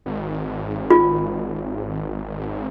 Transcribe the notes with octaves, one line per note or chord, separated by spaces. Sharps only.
G#1
F4